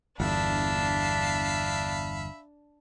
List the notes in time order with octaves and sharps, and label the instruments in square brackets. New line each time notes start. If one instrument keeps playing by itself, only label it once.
[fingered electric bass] G1 E2 [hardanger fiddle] D4 [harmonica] E5 F5 B5